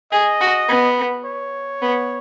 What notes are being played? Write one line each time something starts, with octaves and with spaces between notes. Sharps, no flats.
G#4 D#5
F#4
B3
C#5
B3